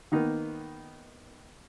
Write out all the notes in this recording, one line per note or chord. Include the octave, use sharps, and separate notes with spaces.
D#3 A#3 B3 D#4